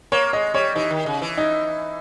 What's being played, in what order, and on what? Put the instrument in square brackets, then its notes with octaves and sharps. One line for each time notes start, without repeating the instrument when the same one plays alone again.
[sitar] A#3 [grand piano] C#5
[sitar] G#3 [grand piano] D#5
[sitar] G3 [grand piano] C#5
[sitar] E3 [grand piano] D#4
[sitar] D#3
C#3
E3
[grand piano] D#4